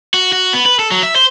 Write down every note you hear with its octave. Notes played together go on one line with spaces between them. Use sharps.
F#4
F#4
B3
B4
A4
F#3
E5
C5